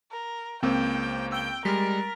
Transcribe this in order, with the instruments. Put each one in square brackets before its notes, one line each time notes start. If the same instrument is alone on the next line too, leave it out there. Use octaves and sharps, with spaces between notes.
[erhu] A#4
[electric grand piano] C#2 A#3 [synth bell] C4 C5 [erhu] G5
[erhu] G5 [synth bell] E6 D7 G7
[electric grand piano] G3 G#3 [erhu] A#4 [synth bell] F6 A6 B6